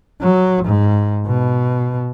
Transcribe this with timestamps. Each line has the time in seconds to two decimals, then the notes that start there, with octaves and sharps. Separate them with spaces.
0.21 F#3
0.65 G#2
1.26 B2